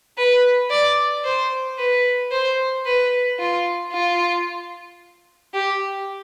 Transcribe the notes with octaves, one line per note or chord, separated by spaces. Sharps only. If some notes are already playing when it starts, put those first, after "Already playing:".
B4
D5
C5
B4
C5
B4
F4
F4
G4